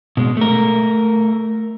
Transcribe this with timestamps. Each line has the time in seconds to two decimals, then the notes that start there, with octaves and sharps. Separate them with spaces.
0.17 B2 G#3
0.37 A3 A#4